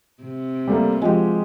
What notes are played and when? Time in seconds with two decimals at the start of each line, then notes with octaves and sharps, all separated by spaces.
0.23 C3
0.67 G3 A3 A#3
1.02 F3 G#3 F#4 G4